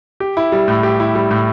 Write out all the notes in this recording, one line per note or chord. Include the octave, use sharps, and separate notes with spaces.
G4
E4
G3
A2
G4
E4
G3
A2